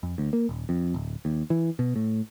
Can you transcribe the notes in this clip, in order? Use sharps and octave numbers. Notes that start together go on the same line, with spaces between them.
F2
D2
A#3
D#1
F2
D1
D#2
E3
B2
A2